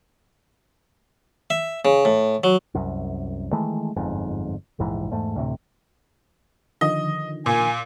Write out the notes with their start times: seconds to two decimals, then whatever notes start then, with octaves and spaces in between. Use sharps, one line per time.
1.50 E5
1.85 C#3
2.05 A2
2.44 F#3
2.75 C2 F#2
3.53 D#3 E3 G#3 A3
3.96 G1 F2 G#2
4.79 F1 A#1 G#2 E3
5.11 E2 G#2 A3
5.36 D2 A2 C3
6.81 D3 D#3 F3 D#5
7.46 A#2 G#5